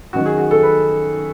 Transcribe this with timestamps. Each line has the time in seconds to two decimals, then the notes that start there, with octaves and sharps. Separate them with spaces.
0.13 F#2 D#3 F#4
0.26 G#4
0.38 F#4
0.51 A4
0.63 B4